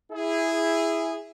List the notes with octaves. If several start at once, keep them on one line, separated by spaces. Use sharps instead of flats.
E4 G#4